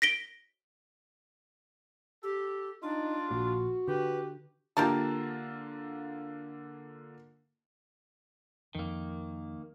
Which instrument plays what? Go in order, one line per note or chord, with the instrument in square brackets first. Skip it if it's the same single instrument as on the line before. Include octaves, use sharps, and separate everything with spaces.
[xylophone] A#6 B6 D7 G7
[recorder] G4 [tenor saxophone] A4
[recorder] D4 [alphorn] D#4 [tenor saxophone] F4
[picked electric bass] A#1 A#3 [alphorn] F#4
[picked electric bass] D3 [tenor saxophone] G4 [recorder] B4
[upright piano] D3 A#3 F4 [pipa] G4 A#4 A5
[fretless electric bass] F2 [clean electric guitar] D#3 A#3